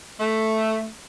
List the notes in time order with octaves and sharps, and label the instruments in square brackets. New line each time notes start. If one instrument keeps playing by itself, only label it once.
[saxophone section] A3